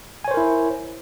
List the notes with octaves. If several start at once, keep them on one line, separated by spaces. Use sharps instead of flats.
E4 A#4 C5 C#5 G#5